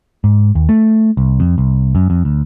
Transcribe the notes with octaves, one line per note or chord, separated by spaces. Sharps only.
G#2
D#2
A3
C2
F2
C2
F#2
F2
D2